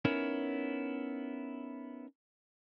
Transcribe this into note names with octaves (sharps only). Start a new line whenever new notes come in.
B3 C#4 D#4 E4 A#4 C#5